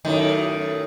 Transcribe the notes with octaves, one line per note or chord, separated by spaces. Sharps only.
F#2 A2 D#3